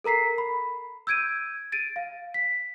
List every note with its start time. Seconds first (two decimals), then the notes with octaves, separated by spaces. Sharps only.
0.04 A4 A#4 A#5 B6 C7
0.38 B5
1.07 E6 G6 G#6 D7 D#7
1.72 A6 D7 D#7
1.96 F5
2.34 B6